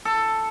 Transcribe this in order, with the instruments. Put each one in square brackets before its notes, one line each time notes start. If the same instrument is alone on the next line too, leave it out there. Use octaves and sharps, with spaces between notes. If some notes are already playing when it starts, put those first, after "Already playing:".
[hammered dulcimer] A4